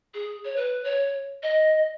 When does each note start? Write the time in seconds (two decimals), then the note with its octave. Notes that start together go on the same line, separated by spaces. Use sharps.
0.14 G#4
0.44 C#5
0.56 B4
0.84 C#5
1.42 D#5